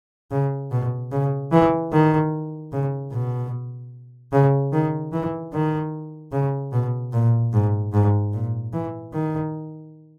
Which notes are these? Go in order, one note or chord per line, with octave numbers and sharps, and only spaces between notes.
C#3
B2
C#3
E3
D#3
C#3
B2
C#3
D#3
E3
D#3
C#3
B2
A#2
G#2
G#2
A#2
E3
D#3